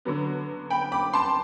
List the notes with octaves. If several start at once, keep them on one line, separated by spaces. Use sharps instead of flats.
D3 F#3 B3
G5 B5
B5 D6
A5 C6